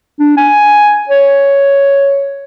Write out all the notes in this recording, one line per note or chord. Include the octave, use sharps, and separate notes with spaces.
D4
G#5
C#5